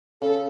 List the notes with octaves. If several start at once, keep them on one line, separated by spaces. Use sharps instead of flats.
C#3 A4